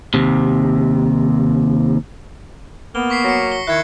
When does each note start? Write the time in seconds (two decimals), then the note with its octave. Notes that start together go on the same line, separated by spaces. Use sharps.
0.14 D#2 C3
2.95 A#3 B3 G7
3.10 C#6 B6 C7
3.24 F#3 A#6 C7 C#7
3.52 G7
3.67 D#3 E4 F#6 G#6 C#7